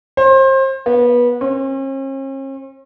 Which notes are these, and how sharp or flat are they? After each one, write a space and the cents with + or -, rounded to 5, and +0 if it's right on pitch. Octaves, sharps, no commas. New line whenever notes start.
C5 +30
B3 -25
C#4 -45